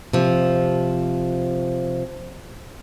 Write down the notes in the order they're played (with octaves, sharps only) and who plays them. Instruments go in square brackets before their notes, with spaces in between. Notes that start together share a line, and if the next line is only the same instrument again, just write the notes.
[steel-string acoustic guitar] C3 F3